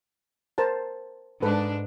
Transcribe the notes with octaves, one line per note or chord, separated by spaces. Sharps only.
A#4 C5 A5
G#2 D4 A4 B4